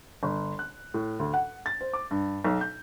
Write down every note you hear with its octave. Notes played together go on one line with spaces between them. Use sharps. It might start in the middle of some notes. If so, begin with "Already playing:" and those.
G1
F#6
A2
D2
F#5
A6
C5
D6
G2
B1
G6